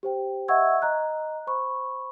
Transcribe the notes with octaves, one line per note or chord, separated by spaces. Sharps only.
G4 C5 G5
D#5 E5 F#5 C#6 E6 G#6
D#5 A#5 F#6
C5 B5 C#6